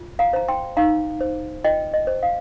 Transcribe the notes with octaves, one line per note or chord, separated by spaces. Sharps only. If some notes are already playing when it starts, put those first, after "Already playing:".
Already playing: F4
F5 A#5
C5 A#5
G5 C6
D#4 F5 A#5
C5
F4 D#5 G5
D#5
C5
F5